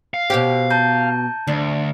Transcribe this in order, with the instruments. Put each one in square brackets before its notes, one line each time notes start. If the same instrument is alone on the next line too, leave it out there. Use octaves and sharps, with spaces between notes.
[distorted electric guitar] F5
[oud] B2 C#4 G4 [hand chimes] C5
[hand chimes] A5 A#5 G6
[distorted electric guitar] D2 [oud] D4